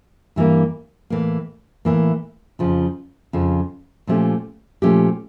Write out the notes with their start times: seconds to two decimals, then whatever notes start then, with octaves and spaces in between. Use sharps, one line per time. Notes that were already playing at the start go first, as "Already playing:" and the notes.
0.36 G2 E3 G3 A#3
1.10 A2 E3 A#3
1.85 A2 E3 A#3
2.59 F2 C#3 F3
3.33 F2 C#3 F3
4.07 A#2 F3 A3 C#4 G4
4.82 A#2 F3 A3 C#4 G4